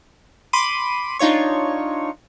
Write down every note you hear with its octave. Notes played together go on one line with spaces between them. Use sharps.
B5 C6 D6 D#7
D4 D#4 F4 C#5 C#6